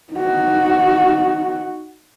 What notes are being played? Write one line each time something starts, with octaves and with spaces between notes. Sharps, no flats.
D#4 F#4